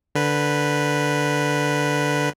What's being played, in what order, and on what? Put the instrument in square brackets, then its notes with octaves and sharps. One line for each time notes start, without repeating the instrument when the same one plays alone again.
[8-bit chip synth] D3 B4